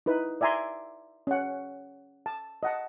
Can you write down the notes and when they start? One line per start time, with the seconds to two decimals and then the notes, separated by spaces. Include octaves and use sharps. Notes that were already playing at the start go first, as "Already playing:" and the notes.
0.06 D#4 E4 B4
0.41 D5 E5 G#5 A#5 C6
1.27 C#4 F#5
2.26 A5
2.63 D#5 F#5 A5